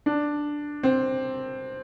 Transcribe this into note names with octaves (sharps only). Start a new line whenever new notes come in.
D4
C4